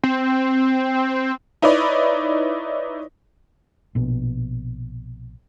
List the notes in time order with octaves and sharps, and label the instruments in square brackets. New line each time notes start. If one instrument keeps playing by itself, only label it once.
[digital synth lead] C4
[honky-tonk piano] D#4 E4 B4 C#5 D5
[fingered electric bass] A#1 B2